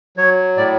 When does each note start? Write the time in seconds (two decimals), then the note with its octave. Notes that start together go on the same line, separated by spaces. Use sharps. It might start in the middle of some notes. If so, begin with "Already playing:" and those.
0.17 F#3 C#5
0.57 A2 D5